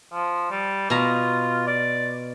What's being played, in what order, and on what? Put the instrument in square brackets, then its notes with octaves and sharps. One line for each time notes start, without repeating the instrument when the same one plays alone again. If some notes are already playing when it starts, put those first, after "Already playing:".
[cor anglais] F3
G3
[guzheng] B2 A#5 [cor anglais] F4
[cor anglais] D5